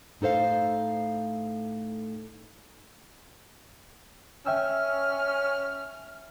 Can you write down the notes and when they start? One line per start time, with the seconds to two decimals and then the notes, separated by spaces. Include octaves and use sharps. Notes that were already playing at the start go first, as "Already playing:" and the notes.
0.21 A2 D#4 A4 C5 F5
4.46 C#4 E5 G5 E6 F6